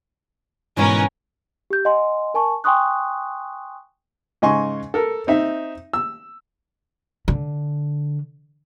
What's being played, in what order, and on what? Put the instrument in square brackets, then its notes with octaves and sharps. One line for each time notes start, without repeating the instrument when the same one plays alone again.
[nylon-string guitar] G#2 B2 E3 [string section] C#4 A#4
[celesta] G4 G6
D#5 F#5 G#5 C6
A#4 G#5 A5 C#6
G5 G#5 C6 C#6 D#6 F#6
[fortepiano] G#2 C#3 D#5 G#5 C6 C#6
A4 A#4
C4 D#4 E5
E6
[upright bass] D3